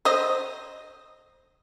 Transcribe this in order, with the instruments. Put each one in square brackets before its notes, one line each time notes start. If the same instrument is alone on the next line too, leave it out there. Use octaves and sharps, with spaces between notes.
[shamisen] C5 D#5